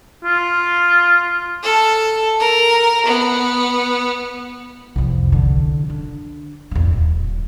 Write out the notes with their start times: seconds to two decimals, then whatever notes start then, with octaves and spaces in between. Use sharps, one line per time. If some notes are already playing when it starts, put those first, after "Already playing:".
0.25 F4
1.63 A4
2.40 A#4
3.06 B3
4.96 C2 F2
5.32 D3
5.90 D4
6.71 E2 A#3
6.93 D1